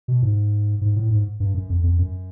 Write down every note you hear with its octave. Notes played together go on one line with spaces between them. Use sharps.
B2
G#2
G#2
A2
G#2
G2
F#2
F2
F2
F#2